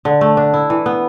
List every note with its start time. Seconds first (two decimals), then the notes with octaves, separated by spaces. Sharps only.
0.05 D3
0.21 A3
0.37 D4
0.54 E4
0.70 E3
0.86 B3